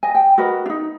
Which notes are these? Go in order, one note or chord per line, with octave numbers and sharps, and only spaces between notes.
D#5 G#5
G5
F#4 A#4 B4 D#5
D4 D#4